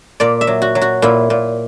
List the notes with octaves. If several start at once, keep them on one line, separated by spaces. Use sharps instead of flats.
A#2 D5
E5
F#3
F#4
F#3
F#4
A#2 E4
A#2